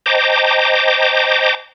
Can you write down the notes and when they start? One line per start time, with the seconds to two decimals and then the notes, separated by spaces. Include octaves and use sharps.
0.06 C5 D#5 G5 A5 A#5 D6